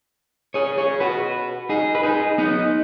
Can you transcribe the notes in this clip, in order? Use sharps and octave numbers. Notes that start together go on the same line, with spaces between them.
G#4 C#5
G#4 C#5
F#4 B4
D#4 G#4
B4
D#4 G#4
B3 D#4